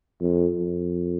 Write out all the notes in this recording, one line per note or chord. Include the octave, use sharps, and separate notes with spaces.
F2
F2